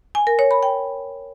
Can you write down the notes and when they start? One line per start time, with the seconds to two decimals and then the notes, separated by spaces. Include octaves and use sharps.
0.15 G#5
0.27 A#4
0.39 C#5
0.51 B5
0.63 G5